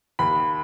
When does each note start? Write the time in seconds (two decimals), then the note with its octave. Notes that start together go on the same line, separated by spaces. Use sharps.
0.19 D#2 B5